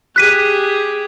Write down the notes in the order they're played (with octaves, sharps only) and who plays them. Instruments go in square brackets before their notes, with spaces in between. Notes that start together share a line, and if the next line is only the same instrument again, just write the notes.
[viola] G4 G#4 [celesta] F#6 B6 D#7